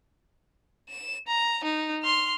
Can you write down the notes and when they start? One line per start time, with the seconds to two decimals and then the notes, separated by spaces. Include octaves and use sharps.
0.89 E7
1.28 A#5
1.64 D#4
2.03 C6 F6